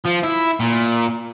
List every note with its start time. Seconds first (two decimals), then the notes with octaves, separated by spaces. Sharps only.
0.06 F3
0.24 E4
0.60 A#2